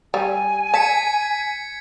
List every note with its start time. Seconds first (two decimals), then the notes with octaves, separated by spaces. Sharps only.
0.14 G3 G#5
0.74 A5 G#6 B6 C#7